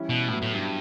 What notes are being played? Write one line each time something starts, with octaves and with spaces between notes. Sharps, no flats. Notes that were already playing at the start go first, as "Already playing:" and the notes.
Already playing: E3 G3 C#4 E4
B2
A2 F#3 B3 E4
A2
G2